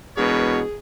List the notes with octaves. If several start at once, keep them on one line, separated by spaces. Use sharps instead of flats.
E1 B2 G#4 A#4 B4 C#5